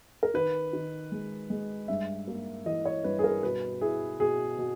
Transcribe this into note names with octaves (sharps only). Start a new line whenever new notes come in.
A#4
D#3 B4
D#3
G#3
G#3
G2 E5
A#3
E3 D#5
C#5
G2 B4
G#4
A#4
B2 B4
E4 G#4
B2 G#4
B2